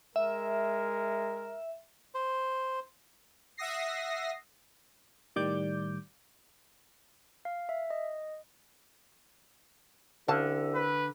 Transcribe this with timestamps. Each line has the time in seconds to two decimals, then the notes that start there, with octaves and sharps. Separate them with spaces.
0.16 G#3 A#4 E5
2.15 C5
3.57 E5 F#5 D#6 A#6 C7
5.36 A2 D#3 G3 D5 D6 G6
7.45 F5
7.69 E5
7.90 D#5
10.28 C2 D3 C#4 F5 A5
10.75 B4